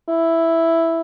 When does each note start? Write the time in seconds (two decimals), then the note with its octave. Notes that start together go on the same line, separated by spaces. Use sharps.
0.09 E4